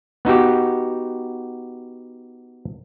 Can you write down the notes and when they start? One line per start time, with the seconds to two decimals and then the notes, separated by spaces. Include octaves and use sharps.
0.25 B3 D#4 F#4 G4